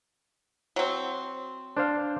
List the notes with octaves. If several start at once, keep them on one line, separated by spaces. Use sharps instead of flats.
F#3 C4
D4 C5 F5